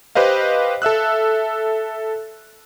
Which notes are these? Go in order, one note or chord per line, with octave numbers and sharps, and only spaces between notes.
G4 B4 C5 D#5 F5
A4 E5 E6 F#6